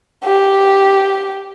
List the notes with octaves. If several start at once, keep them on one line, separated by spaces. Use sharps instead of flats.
G4